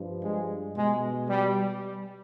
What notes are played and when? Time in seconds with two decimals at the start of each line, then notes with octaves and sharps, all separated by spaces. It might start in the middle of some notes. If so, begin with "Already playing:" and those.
Already playing: G2 F3
0.23 G#3
0.76 B2 G#3
1.29 G3